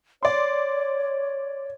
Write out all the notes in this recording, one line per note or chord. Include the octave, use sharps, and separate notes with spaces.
C#5 D5 C6